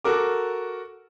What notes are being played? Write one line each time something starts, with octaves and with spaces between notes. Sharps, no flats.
F#4 A4 A#4 D6